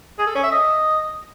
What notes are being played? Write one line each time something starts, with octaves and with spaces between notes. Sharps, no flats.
G#4
A4
C#4
E5
D#5